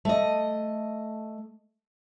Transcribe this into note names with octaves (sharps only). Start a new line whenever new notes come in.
A3 D#5